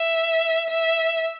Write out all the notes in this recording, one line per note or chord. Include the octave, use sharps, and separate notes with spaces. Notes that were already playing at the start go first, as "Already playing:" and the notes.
Already playing: E5
E5